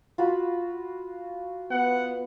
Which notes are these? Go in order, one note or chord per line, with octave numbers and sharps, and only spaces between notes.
F4 F#4 B5
B3 F#5